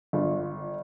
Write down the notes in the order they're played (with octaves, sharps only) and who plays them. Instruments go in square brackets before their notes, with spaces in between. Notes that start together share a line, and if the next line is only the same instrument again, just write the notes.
[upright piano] G1 F4